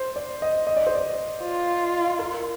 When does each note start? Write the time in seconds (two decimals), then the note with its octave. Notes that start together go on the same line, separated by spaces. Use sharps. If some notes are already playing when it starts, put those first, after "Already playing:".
Already playing: C5
0.16 D5
0.42 D#5
0.67 D#5
0.76 D5
0.87 C5
0.95 D5
1.43 F4
2.19 A#4